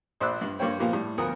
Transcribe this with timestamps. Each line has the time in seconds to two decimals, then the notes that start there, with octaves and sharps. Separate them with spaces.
0.21 A#1 C5 D5 B5 E6 F#6
0.41 G2
0.59 G2 A#3 C5 C#5 G5
0.79 A#2 F3 A#3 B3 G4
0.93 A2 G3
1.18 D2 F3 B3 A#4 D#6